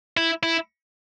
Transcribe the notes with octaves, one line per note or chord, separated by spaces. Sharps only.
E4
E4